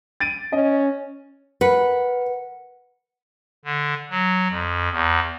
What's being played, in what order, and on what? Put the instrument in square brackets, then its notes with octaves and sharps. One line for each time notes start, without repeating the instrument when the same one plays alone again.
[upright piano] A6 D7 D#7
[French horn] C#4 [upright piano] D#5
[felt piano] A#4 [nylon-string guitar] B4 [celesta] F#5 C#7
[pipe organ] D3
F#3
F2
E2